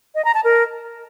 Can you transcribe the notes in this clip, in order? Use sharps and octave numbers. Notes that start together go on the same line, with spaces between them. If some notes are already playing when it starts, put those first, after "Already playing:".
D#5
A#5
A5
A#4